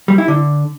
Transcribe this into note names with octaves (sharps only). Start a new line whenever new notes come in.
G3
E4
D3